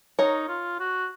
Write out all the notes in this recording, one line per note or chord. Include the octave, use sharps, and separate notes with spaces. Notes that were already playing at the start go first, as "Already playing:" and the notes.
D#4 A#4 C#5
F4
F#4